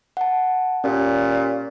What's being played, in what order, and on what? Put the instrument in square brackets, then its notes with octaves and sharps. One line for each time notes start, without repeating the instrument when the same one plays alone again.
[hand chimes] F#5 A5
[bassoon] A#2 [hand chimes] C#4 G4